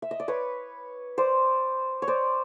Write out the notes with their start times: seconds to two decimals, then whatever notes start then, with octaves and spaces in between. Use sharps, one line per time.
0.02 E5
0.11 D#5
0.20 D5
0.28 B4 C#5
1.18 C5 D5
2.02 C#5
2.07 C5 D5